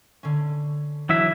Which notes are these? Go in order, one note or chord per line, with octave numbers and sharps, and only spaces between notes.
D3 C#4
E3 F#3 D4 E4 E5